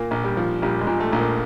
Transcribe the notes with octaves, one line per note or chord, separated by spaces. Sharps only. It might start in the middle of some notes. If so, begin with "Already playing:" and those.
Already playing: A#2 A#3
A#1
G3
F3
A#1 G3
G#3
A#2
A3
A#1
A#3